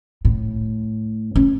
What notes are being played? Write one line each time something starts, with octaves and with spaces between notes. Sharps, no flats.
A2
C#4